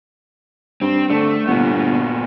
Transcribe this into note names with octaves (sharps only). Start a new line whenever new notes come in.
G2 C4
D3 A3
G1 A#2 B3